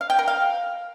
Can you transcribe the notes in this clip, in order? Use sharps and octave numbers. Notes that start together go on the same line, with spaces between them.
F5
G5
A#4
F5